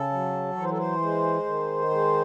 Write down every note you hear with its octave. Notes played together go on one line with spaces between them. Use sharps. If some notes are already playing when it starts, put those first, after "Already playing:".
Already playing: C#3 A4
F#3
E3 C#5
C5
A4
C5
G#3
D#3
G#3